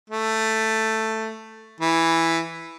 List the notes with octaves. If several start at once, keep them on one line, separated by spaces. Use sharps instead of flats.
A3
E3